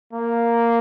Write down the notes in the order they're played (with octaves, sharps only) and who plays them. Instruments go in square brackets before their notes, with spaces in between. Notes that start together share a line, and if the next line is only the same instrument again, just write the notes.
[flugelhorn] A#3